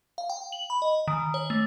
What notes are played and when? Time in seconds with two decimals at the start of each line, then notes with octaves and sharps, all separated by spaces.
0.18 F5
0.30 G5
0.52 F#7
0.70 B5
0.82 D#5
1.08 D#3
1.34 C#5
1.50 A3